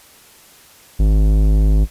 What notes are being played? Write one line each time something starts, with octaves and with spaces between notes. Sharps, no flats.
G#1